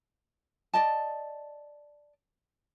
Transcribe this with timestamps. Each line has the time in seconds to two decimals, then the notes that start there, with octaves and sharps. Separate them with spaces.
0.74 D5 D#5 A5